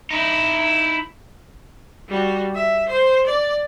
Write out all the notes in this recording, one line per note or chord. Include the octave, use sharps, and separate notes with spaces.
D#4 E4
G3 F#4
E5
C5
D5